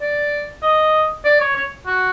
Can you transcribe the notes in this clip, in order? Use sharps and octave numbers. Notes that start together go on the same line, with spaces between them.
D5
D#5
D5
C#5
C#5
F#4